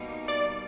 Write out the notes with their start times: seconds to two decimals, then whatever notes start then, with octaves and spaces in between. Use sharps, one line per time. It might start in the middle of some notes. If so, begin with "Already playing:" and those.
Already playing: B2 G3 A#3 D#4
0.28 D5